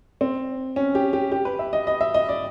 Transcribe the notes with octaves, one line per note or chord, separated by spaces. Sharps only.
C4
C#4
G4
G4
G4
B4
E5
D#5
D#5
E5
D#5
D5